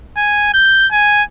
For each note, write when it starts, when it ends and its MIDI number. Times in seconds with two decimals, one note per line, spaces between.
0.17 0.53 80
0.54 0.87 91
0.92 1.23 80